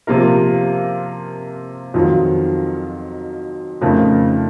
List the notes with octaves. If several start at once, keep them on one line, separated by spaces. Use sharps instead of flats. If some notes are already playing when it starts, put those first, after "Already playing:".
C3 F3 A#3 F4 A#4
F2 D#3 F#3 C4 F4
F2 C#3 A3 D#4 A#4